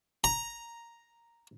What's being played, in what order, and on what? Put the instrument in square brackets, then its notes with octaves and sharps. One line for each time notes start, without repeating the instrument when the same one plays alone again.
[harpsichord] A#5